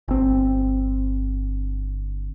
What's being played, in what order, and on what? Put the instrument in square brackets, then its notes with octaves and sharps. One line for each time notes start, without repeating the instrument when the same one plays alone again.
[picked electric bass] G1 C4